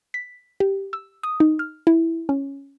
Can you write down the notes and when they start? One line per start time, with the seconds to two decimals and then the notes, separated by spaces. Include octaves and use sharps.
0.14 B6
0.60 G4
0.93 E6
1.23 D#6
1.40 D#4
1.59 F6
1.87 E4
2.29 C#4